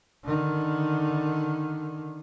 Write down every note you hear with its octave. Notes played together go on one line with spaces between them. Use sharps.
D3 D#3